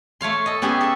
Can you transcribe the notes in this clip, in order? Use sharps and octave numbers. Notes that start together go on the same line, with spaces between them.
A3 C#5 F5 C6
A4 D#5
B3 C#4 G4 G#4 E5
A4 E5